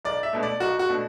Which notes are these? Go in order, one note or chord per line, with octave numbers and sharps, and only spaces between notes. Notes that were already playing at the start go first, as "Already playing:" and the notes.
B1 D5
E5
B2 A3 D4
D5
B1 F#4
F#4
B2 A3 D4